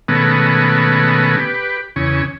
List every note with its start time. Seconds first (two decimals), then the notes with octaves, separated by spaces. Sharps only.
0.08 B2 D#3 G#3 A3 B3 C#4
1.37 G4 B4
1.96 E2 C#3 C#4